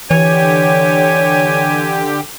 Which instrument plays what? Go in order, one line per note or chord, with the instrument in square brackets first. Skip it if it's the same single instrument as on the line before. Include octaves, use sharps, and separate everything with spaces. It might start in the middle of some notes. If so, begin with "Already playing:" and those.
[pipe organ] D3 G4 [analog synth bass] E3 [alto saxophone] C#5 [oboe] G#5